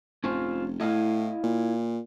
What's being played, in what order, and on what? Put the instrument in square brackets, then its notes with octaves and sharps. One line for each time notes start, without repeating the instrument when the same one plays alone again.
[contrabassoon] F1 [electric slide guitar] C#4 F4 C5
[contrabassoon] A2 [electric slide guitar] E4 D#5 F5
[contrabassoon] A#2